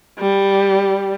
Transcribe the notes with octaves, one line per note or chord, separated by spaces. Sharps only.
G3